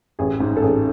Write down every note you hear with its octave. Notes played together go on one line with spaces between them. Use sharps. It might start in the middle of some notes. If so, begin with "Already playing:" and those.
A1 G#4
G#2
A4
A1 G#4